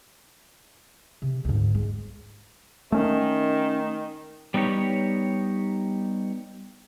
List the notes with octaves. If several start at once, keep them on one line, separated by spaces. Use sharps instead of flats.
C3
D2 G#2
G#3
D#3 A3 C#4
G3 B3 D#4 G4 C#5